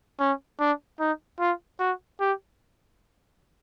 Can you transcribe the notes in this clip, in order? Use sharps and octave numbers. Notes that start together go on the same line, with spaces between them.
C#4
D4
D#4
F4
F#4
G4